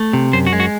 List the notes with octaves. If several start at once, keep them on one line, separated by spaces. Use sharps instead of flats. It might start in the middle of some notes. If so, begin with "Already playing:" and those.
Already playing: A3
C3
F#2 C5
F#4
G#3
F#4